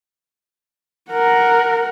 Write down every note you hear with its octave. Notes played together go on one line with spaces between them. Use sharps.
A#4 F#5